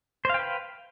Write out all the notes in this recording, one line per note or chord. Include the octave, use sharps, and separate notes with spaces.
B4 C5 F5 G5